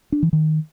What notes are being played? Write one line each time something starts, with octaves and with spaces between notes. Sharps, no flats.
D4
E3
D#3